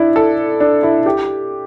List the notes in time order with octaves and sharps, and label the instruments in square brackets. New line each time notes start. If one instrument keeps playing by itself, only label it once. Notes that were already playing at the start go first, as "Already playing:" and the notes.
Already playing: [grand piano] D4 E4
A4
D4
E4
G4